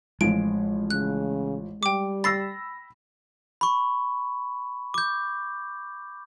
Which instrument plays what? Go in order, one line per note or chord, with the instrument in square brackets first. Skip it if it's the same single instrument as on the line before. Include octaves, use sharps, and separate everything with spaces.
[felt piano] A1 F3 [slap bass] G#3 [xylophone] D7
[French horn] C#3 [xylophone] F#6
[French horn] G3 [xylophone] G5 D6
[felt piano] B5 E6 A#6 [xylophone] A6 C7
[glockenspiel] B5 C#6
D6 G6